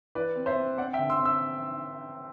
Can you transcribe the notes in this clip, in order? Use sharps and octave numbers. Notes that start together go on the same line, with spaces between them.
E3 B4 D5
C4
C5 E5
C4
C4 D5 F#5
E5 G5
D3
C6 E6
C4
E6